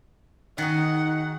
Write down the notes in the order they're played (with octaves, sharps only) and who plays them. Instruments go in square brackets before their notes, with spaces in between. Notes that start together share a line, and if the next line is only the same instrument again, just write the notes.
[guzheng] D#3 F#4 G#4 [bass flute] D#4 [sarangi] F#5